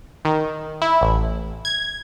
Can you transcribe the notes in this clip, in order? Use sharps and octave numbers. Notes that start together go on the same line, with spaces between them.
D#3
E4
A1
G#6